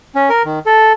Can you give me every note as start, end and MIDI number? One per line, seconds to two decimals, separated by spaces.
0.15 0.29 61
0.30 0.43 70
0.45 0.59 51
0.66 0.93 69